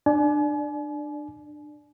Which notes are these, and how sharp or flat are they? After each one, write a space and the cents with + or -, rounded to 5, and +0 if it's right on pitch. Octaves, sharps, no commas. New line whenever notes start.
D4 +25 D5 +0 G#5 +40